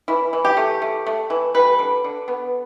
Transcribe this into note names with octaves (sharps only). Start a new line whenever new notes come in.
E3 E4
E3
G4
A3
A3
A3
E3
G3 B4
D3
D3
B3